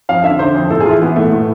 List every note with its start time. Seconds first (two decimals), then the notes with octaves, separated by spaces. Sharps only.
0.09 F2 F5
0.24 D3 E5
0.39 D3 C5
0.55 F2
0.70 A2 A4
0.80 G#4
0.86 E3 F4
0.91 E4
1.02 E3 B3
1.16 A2 A3
1.32 A2